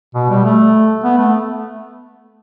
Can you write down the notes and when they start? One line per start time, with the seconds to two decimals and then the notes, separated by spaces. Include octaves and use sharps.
0.15 B2
0.30 G3
0.44 A3
1.04 B3
1.18 A3